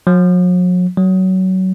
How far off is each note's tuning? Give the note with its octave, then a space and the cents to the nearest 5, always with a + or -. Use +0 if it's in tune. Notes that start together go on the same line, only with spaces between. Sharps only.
F#3 -45
F#3 +20